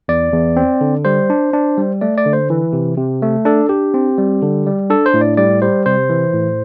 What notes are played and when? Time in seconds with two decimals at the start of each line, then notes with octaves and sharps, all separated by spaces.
0.08 E2 D5
0.32 E2
0.56 C4
0.81 D3
1.05 G3 C5
1.30 D4
1.53 D4
1.78 G3
2.01 A3 D5
2.18 D5
2.26 D3
2.33 C5
2.50 E3
2.73 C3
2.97 C3
3.22 A3
3.45 D4 A4
3.69 D4 G4
3.94 C4
4.18 G3
4.42 D3
4.66 G3
4.90 D4 A4
5.06 C5
5.14 A2
5.21 D5
5.37 G3 D5
5.62 G3 C5
5.86 C3 C5
6.10 E3
6.34 A2